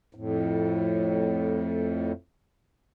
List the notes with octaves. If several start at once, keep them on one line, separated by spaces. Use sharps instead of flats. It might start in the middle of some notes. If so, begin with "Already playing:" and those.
F2 A2